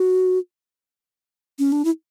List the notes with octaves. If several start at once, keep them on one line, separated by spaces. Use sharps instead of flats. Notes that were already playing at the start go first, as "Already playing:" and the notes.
Already playing: F#4
C#4
D4
E4